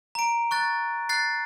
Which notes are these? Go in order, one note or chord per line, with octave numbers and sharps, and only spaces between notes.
A#5 D7
C#6 F#6 A6
F#6 A6 C7